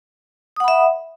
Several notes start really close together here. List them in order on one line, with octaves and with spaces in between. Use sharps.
D#6 F#5 B5 E5